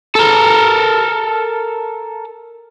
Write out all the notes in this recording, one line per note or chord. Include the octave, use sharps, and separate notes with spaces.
A4 A#4